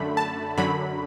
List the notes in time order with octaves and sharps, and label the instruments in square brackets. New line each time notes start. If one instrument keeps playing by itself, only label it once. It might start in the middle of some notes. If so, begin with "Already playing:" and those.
Already playing: [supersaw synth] F#2 D3 A3 B5
A5
F#2 D3 F#3 B5